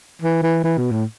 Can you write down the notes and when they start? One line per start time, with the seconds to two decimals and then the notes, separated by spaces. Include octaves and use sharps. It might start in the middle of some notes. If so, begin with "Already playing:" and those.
0.22 E3
0.42 E3
0.64 E3
0.78 B2
0.92 A2